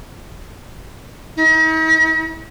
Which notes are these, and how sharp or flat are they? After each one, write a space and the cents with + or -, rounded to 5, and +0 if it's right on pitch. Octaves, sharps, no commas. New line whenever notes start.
D#4 +45